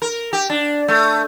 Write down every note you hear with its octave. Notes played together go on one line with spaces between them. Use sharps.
A#4
G4
D4
A3